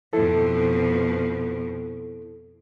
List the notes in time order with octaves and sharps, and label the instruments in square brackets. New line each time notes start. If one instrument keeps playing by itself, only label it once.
[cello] F2 B2 [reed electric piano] E4 A4